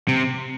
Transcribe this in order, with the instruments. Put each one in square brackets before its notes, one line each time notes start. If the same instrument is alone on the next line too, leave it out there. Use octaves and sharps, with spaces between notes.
[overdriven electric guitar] C3